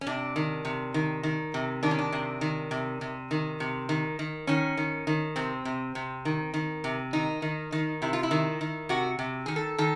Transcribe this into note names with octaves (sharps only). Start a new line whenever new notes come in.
C#4
C3 D4
D#3
C3
D#3
D#3
C3
D#3 D4
C#4
D4
C3
D#3
C3
C3
D#3
C3
D#3
D#3
D#3 C#4
D#3
D#3
C3 C4
C3
C3
D#3
D#3
C3
D#3 D#4
D#3
D#3
C3 E4
F4
E4
D#3
D#3
C3 F#4
C3
D#3 G#4
A4
D#3 A4